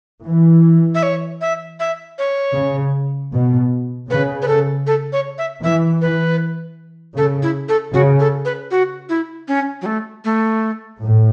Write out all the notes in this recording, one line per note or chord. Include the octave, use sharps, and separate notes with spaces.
E3
E5
C#5
E5
E5
C#5
C#3
B2
C#3 B4
B4
A4
A4
C#5
E5
E3 E5
B4
C#3 A4
E4
A4
C#3 F#4
A4
B4
F#4
E4
C#4
F#3
A3
A3
A2